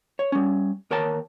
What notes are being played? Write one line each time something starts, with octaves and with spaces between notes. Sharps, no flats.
C#5
G3 C#4
D#2 A#4 C#5 G5 A5